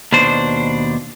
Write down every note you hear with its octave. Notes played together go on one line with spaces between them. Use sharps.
D#2 B2 D4 C5